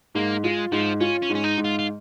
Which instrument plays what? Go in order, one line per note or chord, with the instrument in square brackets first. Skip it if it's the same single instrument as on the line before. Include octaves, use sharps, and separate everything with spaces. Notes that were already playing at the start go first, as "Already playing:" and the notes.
[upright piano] G#2 [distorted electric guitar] A#3
[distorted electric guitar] G#3 [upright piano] F4
[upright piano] G#2 [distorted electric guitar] F3
[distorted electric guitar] C#4 [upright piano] F4
[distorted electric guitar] C#4
[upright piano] G#2
[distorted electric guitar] C#4
D#4
[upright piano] G#2
[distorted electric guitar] F4
F4